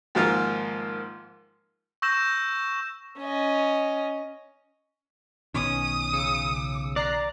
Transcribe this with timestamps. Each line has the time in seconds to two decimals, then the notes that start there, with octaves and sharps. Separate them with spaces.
0.15 G#2 D#3 F3 A#3 F4
2.02 C#6 E6 G6 A#6 E7
3.20 C#4 D#5
5.54 B1 B2 D#3 C#4 D#6
6.13 C#3 E6 C#7
6.96 D5 A#5 F#6 C7